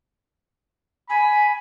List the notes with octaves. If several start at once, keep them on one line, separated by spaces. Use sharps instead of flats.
G#5 B5